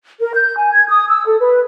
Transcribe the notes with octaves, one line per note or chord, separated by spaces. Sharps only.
A#4
G6
G#5
G#6
D#6
E6
A4
B4